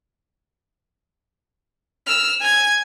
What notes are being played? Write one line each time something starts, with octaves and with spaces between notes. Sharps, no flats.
E6 F6
G#5 G#6